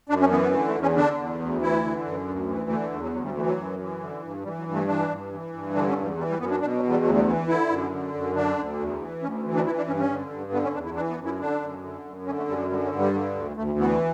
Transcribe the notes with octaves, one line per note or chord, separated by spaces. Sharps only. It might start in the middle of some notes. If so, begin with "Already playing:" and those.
F#2 D4
C#4
E3 B3
B3
D3 A3
A3
E2
C#4
D3 D4
E2
D2
E3 E4
D3
F#2
D2
E3
D3 A3
A3
E2 A3
F#3
D2 F#3
G3
E3 A3
F#3
F#2
E3
D3
G2
E3 G3
F#3
G2
A3
E3 D4
G2
E3
G2
D3 D4
C#4
E2
G3
E3 G3
G3
F#2 B3
D4
B2 D4
F#3
E2
G3
D2 F#3
G3
E3 B3
D3 E4
F#2
D3
F#2
D3 D4
D2
E2
E3
D2 C#4
E3
D4
E3 E4
D4
G2 C#4
C#4
D3
G2
D3 B3
C#4
E2 D4
E4
E3 D4
B3
F#2
E4
D3 D4
F#2
D3
F#2
D3 C#4
A3
F#2 G3
F#3
D3 G3
F#3
G2
G3
D3
D2
D2 A3
E3 B3